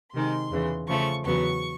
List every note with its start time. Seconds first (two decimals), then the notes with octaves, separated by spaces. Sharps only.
0.13 C3 D#3 G#3 C6
0.51 E2 C#3 E3
0.88 C#3 F3 A3 C#6
1.25 E2 C#3 F#3 B3 C#6